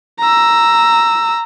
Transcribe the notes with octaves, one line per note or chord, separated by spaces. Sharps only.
A#5 E6